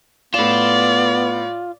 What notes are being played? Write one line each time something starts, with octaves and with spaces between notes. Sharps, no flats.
A2 B3 F4 D5 E7